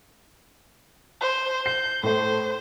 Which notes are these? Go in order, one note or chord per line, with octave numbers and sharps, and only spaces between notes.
C5
G6 C7
A2 A3 C5